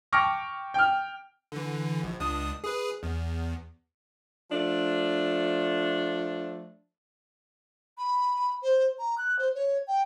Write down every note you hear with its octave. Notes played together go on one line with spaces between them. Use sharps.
G5 A5 C#6 D6 F6 A#6
G5 F6
D3 E3
A#1
C#2 D4 D#6
G#4 B4
E2
F3 A3 D4
B5
C5
A#5
F#6
C5
C#5
G5